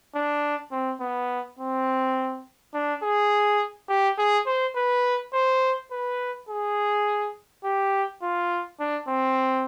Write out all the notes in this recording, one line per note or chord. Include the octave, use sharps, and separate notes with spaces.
D4
C4
B3
C4
D4
G#4
G4
G#4
C5
B4
C5
B4
G#4
G4
F4
D4
C4